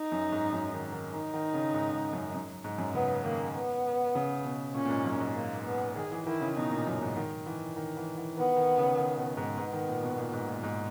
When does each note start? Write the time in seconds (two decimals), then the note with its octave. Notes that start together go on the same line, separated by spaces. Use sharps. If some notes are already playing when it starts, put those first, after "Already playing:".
Already playing: D#4
0.12 F#2
0.32 G#2
0.53 F#2
0.73 D#3
0.92 D#3
1.13 D#3 D#4
1.34 D#3
1.54 C#3
1.74 G#2
1.93 G#2
2.13 F#2
2.34 F#2
2.64 G#2
2.78 F#2
2.94 C#3 B3
3.24 D#3 A#3
3.54 B3
4.15 C#3
4.45 B2
4.75 A#2 C#4
4.85 A#2
4.90 G#2
5.05 F#2
5.20 G#2
5.36 A#3
5.66 B3
5.96 D#3 G#4
6.11 E3
6.26 D#3 E4
6.41 C#3
6.56 B2 D#4
6.71 A#2
6.87 F#2
7.02 G#2
7.16 D#3
7.46 E3
7.76 D#3
7.97 E3
8.17 E3
8.37 D#3 B3
8.57 D#3
8.78 C#3
8.97 D#3
9.17 B2
9.37 G#2
9.57 G#2 B3
9.73 D#3
9.88 A#2
10.03 B2
10.18 A#2
10.33 G#2
10.48 A#2
10.63 G#2